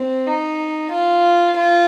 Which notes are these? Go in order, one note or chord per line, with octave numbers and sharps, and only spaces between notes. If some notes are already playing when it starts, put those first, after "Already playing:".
Already playing: C4
D#4
F4
F4